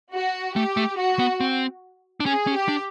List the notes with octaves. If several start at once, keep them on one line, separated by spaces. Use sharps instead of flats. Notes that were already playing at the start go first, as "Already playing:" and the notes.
F#4
A3 G4
A3
F#4
B3
C4
D4
C#4 G#4
C#4
G4
D4